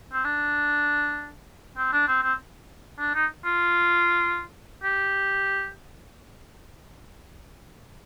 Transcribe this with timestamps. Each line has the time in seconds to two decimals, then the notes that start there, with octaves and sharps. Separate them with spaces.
0.13 C4
0.24 D4
1.77 C4
1.93 D4
2.08 C4
2.23 C4
2.99 D4
3.14 D#4
3.45 F4
4.83 G4